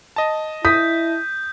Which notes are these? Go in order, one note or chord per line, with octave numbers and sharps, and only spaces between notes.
D#5 A5
E4 D#6 G6 B6